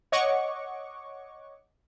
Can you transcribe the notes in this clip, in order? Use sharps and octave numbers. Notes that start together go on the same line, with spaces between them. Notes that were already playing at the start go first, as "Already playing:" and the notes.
C#5 D#5 F#5 C#6 D6